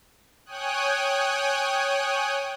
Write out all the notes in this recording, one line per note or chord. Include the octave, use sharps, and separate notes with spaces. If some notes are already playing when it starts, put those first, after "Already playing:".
C#5 G5 G#5 D#6 F#6